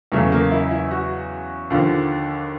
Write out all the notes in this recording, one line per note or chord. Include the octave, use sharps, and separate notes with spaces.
E2 C#3 F#3 A3
A#3
E4
E4
F#4
D#2 D3 F3